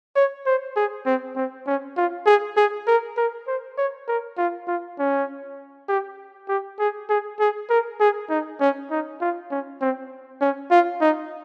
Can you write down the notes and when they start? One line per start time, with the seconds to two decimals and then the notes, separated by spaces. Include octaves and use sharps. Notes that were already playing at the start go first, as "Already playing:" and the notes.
0.16 C#5
0.46 C5
0.76 G#4
1.06 C4
1.36 C4
1.67 C#4
1.97 F4
2.26 G#4
2.57 G#4
2.87 A#4
3.17 A#4
3.47 C5
3.78 C#5
4.08 A#4
4.38 F4
4.67 F4
4.99 C#4
5.89 G4
6.48 G4
6.79 G#4
7.09 G#4
7.40 G#4
7.70 A#4
8.00 G#4
8.29 D#4
8.60 C#4
8.91 D#4
9.21 F4
9.51 C#4
9.81 C4
10.41 C#4
10.71 F4
11.01 D#4